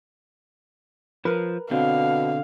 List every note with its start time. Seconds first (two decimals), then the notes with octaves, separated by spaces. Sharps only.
1.25 F3 A#4 B4
1.71 B2 D3 C4 F5